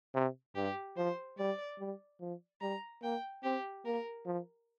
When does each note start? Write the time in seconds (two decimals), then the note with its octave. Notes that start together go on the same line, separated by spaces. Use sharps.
0.14 C3
0.55 G2 G4
0.97 F3 C5
1.38 G3 D5
1.79 G3
2.20 F3
2.61 G3 A#5
3.02 A#3 G5
3.44 C4 G4
3.85 A#3 A#4
4.26 F3